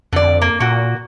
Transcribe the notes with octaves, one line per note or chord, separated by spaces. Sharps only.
F2 D3 D5
A#3
A#2 A#3 F#4